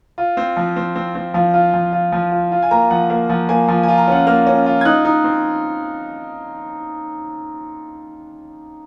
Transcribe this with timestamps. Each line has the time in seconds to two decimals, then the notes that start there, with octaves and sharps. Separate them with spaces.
0.18 F4
0.37 C4
0.57 F3
0.76 C4
0.95 C4
1.15 C4
1.34 F3 F5
1.54 F4
1.74 F3
1.93 F4
2.12 F3
2.32 F4
2.52 F4
2.62 G#5
2.71 A#3 A#5
2.90 F3 F#5
3.10 A#3 F5
3.30 F3 F#5
3.49 A#3 G#5
3.68 F3
3.83 G#5
3.88 F4
3.98 A#5
4.08 C#4 F#5
4.27 A#3 F6
4.47 C#4
4.66 F4
4.81 G#6
4.85 D#4 F#6
5.05 D#4
5.24 C4